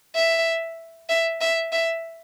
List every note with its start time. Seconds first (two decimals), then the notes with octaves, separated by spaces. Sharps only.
0.15 E5
1.09 E5
1.41 E5
1.72 E5